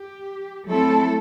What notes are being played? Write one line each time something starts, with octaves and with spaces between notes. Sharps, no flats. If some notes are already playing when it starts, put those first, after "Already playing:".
Already playing: G4
F#3 A3 C4 E4 A4